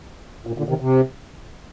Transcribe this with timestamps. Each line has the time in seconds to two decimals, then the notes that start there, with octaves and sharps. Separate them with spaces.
0.47 A#2
0.58 A#2 D3
0.69 C3 D#3
0.80 C3